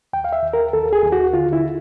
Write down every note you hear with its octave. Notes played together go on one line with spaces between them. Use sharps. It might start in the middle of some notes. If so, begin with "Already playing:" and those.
D#2 G5
F5
E5
D#2
A#4
D#2 A4
G#4
D#2
F#4
D3 F4
E4